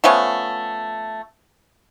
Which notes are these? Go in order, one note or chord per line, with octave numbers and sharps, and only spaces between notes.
F3 A3 B3 C#4